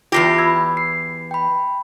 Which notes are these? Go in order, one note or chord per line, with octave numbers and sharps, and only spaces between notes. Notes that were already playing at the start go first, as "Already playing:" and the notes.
E2 G#2 F4 G4 A#6 C7
B5 E6 G#6
C7
G5 B5